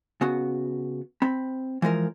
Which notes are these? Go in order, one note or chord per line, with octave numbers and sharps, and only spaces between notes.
C#3 B3 F#4
C4 B5
E3 F3 G#3 A#4